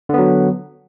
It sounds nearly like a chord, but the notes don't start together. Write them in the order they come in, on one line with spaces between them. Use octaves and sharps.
D3 B3 F#3